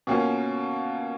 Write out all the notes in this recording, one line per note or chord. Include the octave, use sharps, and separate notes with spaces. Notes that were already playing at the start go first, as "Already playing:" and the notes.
B2 A#3 C#4 F4